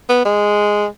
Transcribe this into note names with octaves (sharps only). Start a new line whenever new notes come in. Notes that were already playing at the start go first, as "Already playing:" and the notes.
B3
G#3